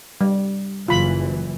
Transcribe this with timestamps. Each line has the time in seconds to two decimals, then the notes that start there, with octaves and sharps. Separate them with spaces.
0.21 G3
0.88 F#1 E3 F4 B5